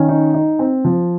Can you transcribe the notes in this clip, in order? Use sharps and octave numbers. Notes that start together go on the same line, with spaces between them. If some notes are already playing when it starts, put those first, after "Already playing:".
Already playing: D#3 C#4 C#5
D#4
D#4
C4
F3